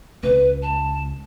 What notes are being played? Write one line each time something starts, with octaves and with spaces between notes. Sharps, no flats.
C#2 B4
A5